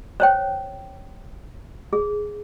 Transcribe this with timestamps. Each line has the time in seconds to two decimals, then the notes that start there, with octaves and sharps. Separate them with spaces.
0.20 C5 C#5 G5
1.93 G#4